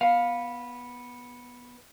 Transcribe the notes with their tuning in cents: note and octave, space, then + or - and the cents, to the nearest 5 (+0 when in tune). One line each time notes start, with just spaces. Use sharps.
B3 -10 F5 +15